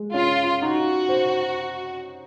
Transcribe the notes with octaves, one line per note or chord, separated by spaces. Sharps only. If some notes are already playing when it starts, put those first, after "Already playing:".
Already playing: G#3
C#4 F4
D#4 F#4
C5